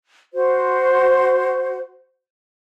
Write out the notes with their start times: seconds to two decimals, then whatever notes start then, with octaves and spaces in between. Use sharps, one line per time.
0.33 F#4 C5